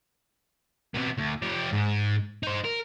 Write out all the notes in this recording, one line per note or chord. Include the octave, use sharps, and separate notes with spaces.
C3 B3
D2
F3 G4
G#2
D#4 C5
A#4